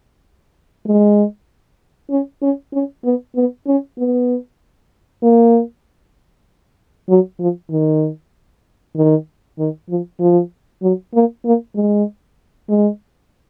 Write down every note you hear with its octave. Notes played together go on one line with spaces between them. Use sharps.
G#3
C#4
C#4
C#4
B3
B3
C#4
B3
A#3
F#3
F3
D#3
D#3
D#3
F3
F3
F#3
A#3
A#3
G#3
G#3